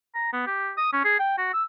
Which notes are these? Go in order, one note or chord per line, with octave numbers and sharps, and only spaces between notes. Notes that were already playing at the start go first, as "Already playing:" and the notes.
A#5
B3
G4
D#6
C#4
G#4
G5
F#4
E6